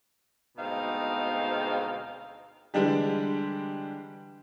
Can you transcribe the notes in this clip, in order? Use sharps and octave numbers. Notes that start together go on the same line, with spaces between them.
D2 B2 G#3 C4 D#4 F5
D3 E3 G3 G#3 D4 G4